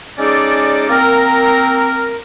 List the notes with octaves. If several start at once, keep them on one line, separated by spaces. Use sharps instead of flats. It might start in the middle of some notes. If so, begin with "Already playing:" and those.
G#3 C#4 D#4 G#4 A4 D5
A#3 C4 A#4